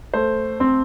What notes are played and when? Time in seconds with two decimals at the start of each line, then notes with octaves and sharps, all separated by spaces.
0.14 A3 C5
0.60 C4